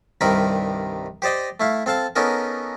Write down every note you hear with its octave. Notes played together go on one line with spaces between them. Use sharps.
C2 G2 D#3 C4 A#4 B5
G4 C5 D5 D#5 G5
A3 E4 F5
C4 A4 F5 A5
B3 C#4 D#4 A4 A#4